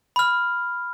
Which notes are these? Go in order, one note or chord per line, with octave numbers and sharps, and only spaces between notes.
B5 F6